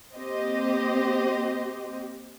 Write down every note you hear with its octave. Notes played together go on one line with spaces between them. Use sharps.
A#3 C4 G4 C5 D#5